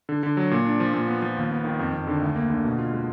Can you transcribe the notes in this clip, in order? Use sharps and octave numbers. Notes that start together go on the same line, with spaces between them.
D3
D3
F#3
A#2
D4
F3
A#2
B3
F3
D#2
B3
D#3
F2
F2
D3
D2
A#3
D3
B2
F4
G#3